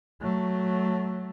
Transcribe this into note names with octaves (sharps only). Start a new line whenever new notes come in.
F#3 A3